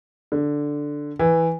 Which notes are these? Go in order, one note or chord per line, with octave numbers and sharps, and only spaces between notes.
D3
E3